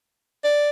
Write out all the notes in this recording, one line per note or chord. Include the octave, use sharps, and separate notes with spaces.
D5